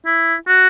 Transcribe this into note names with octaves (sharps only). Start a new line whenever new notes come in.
E4
F#4